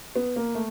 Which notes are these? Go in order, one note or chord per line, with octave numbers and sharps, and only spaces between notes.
B3
A#3
A3